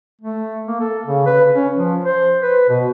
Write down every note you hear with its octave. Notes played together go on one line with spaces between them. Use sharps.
A3
A#3
A4
C#3
B4
C#4
F3
C5
B4
B2